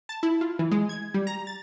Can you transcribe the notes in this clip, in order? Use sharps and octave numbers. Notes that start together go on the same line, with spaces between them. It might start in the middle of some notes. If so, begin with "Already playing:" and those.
A5
E4
F4
E3
G#3
G#6
G3
A#5
A6